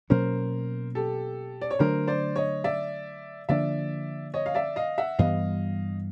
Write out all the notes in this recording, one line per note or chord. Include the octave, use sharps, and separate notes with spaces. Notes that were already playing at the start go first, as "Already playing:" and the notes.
B2 F#3 A#3 C#4 A#4 C5
G4 A4
D5
C#5
D3 F#3 A3 D4 A#4 C5
C5 D5
C#5 D#5
D5 E5
D3 F3 A#3 D4 D5 E5
C#5 D#5
F5
D5 E5
D#5 F5
E5 F#5
G2 E3 G3 B3 D#5 F5